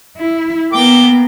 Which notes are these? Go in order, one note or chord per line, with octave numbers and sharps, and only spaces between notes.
E4
A#3 B3 G5 D6